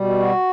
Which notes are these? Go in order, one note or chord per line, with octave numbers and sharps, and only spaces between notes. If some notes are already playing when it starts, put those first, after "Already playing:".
Already playing: B2 G3
F#4